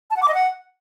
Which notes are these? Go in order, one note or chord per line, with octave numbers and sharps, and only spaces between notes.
A5
F#5
D6
D#5
F#5